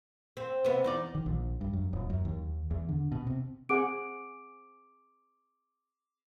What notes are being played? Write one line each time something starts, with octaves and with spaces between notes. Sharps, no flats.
C4
C3 B3
E2 D#4 D5
D#3
A#1
G2
F#2
D#1
F#2
D#2
E2
D3
B2
C3
C4 G#4 F#5 D6 D7